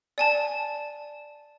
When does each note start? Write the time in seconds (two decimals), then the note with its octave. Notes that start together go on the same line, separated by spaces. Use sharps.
0.18 D5 G#5 A5